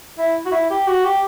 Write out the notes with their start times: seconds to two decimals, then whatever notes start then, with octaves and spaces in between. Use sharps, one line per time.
0.18 E4
0.45 F#4
0.52 E4
0.70 G4
0.87 F#4
1.04 G4